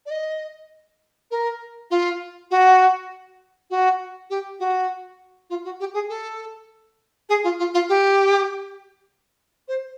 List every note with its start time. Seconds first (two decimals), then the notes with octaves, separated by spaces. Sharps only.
0.06 D5
0.10 D#5
1.31 A#4
1.90 F4
2.51 F#4
3.70 F#4
4.30 G4
4.59 F#4
5.50 F4
5.64 F#4
5.80 G4
5.94 G#4
6.09 A4
7.29 G#4
7.44 F4
7.59 F4
7.74 F4
7.89 G4
9.68 C5